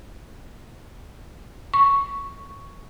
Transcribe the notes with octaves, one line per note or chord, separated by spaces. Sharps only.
C#6